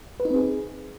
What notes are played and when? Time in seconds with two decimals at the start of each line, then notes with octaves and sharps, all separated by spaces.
0.20 B4
0.25 D#4
0.30 C4
0.36 G#4